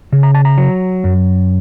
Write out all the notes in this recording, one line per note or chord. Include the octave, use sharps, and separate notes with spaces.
C#3
A#5
A5
A#5
F#3
F#2